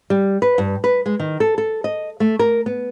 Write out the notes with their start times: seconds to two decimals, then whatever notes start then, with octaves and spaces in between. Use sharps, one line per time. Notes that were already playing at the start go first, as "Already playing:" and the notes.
0.10 G3
0.42 B4
0.58 G2
0.84 B4
1.06 G#3
1.20 D#3
1.40 A4
1.58 A4
1.84 D#5
2.20 A3
2.39 A#4
2.66 B3